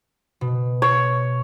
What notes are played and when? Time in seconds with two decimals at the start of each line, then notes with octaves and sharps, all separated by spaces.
0.41 B2
0.82 C#5